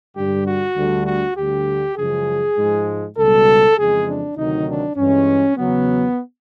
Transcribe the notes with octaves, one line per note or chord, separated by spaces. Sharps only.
G2 D3 G3 G4
F#4
D2 D3 G3
F#4
D2 D3 G3 G4
F#2 C#3 F3 G#3 G#4
G#2 F3 G#3
C#2 B2 G3 A4
F2 C#3 E3 G#3 G#4
D4
D2 C3 D#3 F#3 D#4
D4
G2 E3 G#3 C#4
E2 C#3 F#3 B3